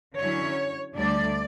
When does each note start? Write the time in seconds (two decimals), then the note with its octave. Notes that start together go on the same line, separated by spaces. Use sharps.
0.18 D3 F#3 C#4 E4 C#5
0.96 D2 D3 G3 D4 D5